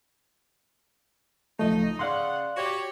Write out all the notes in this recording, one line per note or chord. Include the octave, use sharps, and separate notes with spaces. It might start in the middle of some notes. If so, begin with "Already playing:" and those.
C#2 F3 A3 D#4 D#5
C#3 D5 F5 F#5 C6
F#4 G4 C#5